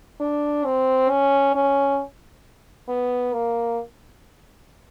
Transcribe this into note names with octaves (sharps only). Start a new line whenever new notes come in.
D4
C4
C#4
C#4
B3
A#3